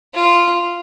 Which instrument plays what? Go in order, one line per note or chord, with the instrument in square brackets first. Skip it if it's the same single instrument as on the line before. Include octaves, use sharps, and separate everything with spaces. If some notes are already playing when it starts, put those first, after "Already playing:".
[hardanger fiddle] F4